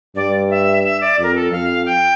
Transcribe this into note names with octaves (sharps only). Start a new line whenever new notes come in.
G2 D5
E5
E5
D5
F2 A#4
A4
F2 F5
G5